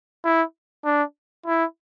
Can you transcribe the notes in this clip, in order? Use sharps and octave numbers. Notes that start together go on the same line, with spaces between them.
E4
D4
E4